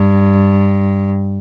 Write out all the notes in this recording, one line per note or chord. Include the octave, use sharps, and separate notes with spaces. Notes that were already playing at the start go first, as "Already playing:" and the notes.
Already playing: G2